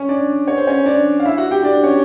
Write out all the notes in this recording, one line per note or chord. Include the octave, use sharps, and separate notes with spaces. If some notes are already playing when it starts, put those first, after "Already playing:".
Already playing: C#4 C#5
D4 D5
C#5
C5
C#4 C#5
D4 D5
F5
E4 E5
F#4 F#5
G4 G5
D4 D5
C#4 C#5